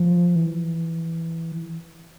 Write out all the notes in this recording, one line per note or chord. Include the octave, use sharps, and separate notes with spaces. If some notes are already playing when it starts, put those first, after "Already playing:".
Already playing: F3
E3